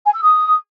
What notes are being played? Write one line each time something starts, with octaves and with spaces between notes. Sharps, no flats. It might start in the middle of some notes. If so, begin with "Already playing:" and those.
G#5
E6
D#6